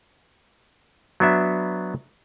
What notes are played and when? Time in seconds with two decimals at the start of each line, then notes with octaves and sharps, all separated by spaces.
1.20 F#3 B3 D4 E5